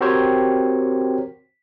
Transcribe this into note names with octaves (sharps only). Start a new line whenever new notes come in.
C4 F#4 G4 A#4 C5 C#5